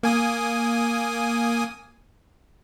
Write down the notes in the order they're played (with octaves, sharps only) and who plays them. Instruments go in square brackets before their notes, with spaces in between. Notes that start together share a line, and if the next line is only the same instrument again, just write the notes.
[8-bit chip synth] A#3 G#5 D#6